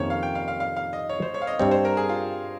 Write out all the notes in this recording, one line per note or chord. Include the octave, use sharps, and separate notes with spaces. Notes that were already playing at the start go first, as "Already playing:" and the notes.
Already playing: F2 C3 D#3 A#3 C#4 C5 C#5
F5
G5
F5
F5
F5
F5
D#5
C#5
C5
C#5
F5
D#5
G2 G3 C4 C#5
C5
A#4
G#4
F4